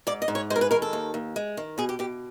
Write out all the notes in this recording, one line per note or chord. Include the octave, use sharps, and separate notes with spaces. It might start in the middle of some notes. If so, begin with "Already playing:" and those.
G#2 D5
D#5
G#2
C#5
G#3 C5
A#4
B4
D#3 A#4
A4
D#2
D#2
G#3
D#3
B2 G#4
G4
B2 G4